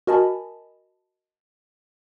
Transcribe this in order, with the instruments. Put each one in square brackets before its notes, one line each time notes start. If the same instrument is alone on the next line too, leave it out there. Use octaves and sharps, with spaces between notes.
[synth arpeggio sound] F#4 A#4 D#5 G#5 A5 B5